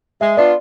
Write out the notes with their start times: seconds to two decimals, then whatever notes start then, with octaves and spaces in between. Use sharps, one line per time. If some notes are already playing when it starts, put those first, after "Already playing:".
0.21 G#3 E5
0.37 B3 D4 F4 D5